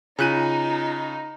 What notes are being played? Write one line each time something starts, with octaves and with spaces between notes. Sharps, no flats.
C#3 D#4 F4 G#5 F#6 D#7